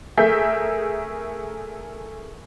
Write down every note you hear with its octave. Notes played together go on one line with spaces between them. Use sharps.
A3 G#4 A#4 E5 G6 B6